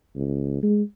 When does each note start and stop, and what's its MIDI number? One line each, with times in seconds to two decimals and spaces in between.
0.16 0.61 37
0.63 0.82 56